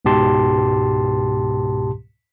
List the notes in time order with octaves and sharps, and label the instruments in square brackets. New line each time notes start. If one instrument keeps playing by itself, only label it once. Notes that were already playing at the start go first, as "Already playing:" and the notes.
[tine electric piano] C#2 G#2 B2 G4 A5 C6